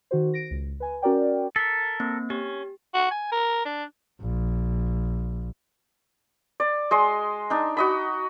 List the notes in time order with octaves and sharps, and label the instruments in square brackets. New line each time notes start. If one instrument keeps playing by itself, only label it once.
[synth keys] D#3 F#4 C5
A#6 D7
C#2
B4 G#5
C#4 F#4 A#4 D5 G5
[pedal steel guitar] A4 A#4 [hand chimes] B6
[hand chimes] A#3 C4
[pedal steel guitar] C#4 [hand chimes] G4
[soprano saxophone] F#4
G#5
A#4
D4
[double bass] A#1
[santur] D5
G#3 D#5 C6
D4 D#4
F#4 D#5 B5